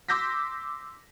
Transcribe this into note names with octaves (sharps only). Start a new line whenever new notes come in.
C6 D6 E6 G6 A#6 B6